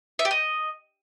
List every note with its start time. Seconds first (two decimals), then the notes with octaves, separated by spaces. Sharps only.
0.19 E5
0.25 G4
0.31 D#5